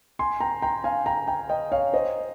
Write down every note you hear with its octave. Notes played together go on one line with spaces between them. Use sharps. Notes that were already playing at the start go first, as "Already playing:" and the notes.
G#5 C6
G5 A#5
G5 A#5
F5 G#5
G5 A#5
G5 A#5
D#5 G5
C#5 F5
C5 D#5